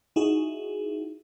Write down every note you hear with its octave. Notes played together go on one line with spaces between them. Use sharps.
D#4 E4 F#4 G#4